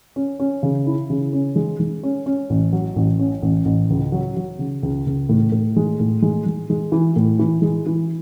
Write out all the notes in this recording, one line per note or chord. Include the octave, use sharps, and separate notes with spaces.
C#4
C#4
C#3
E4
C#3
C#4
G#3
G#3
C#4
C#4
A1
F#3
A1
C#4
A1
A1
C#2
F#3
F#3
C#3
C#2
C#2
A2
A2
G#3
A2
G#3
G#3
G#3
E3
A2
E3
G#3
E3